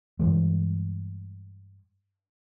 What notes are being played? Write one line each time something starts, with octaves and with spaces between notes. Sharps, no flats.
G2 E3 G3 G#3